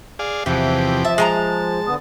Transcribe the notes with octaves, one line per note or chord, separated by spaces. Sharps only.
G#4 D5 F5
E2 C3 E3 F3 G4
E5 A5
G#3 G#5 A#5
D3 B3 D#6